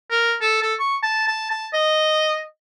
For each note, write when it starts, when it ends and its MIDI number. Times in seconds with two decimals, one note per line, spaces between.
0.10 0.35 70
0.41 0.59 69
0.62 0.74 69
0.80 0.96 85
1.03 1.23 81
1.28 1.47 81
1.50 1.68 81
1.73 2.44 75